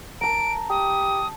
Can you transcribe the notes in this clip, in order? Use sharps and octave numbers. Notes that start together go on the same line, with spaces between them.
A5 A#5 D7
G4 D#6